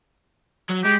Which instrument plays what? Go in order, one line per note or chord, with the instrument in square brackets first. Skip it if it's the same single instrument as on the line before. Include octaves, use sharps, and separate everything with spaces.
[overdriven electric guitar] F#3
[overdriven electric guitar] G#3 [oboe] G4